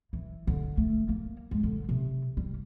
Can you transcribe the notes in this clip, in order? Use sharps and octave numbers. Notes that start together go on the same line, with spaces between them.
E3
D3
A3
A#3
G#3
D3
C3
G3